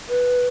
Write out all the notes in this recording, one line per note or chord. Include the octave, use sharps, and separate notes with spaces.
B4